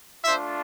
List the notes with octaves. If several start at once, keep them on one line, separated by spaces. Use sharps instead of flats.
A3 D4 F4 C5 E5